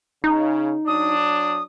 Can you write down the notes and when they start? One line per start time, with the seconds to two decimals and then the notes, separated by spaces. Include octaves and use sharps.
0.24 C#3 D#4
0.87 F#3 D4 D#6